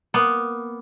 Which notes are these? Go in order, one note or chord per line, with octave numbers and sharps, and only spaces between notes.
A#3 B3